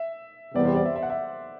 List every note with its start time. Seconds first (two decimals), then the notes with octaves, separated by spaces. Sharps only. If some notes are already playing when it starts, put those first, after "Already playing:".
Already playing: E5
0.55 E2 C3 G3 B3 D5
0.65 C5
0.75 D5
0.85 E5
0.96 E5
1.03 F#5
1.10 E5